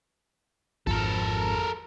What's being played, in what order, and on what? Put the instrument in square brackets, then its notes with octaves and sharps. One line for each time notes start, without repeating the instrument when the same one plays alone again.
[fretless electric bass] G#1 F2 F3 [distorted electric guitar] A4 A#4